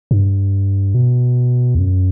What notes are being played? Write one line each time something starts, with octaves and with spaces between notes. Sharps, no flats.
G2
B2
E2
F#2